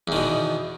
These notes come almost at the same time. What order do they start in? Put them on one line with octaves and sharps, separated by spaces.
E2 D#3 B2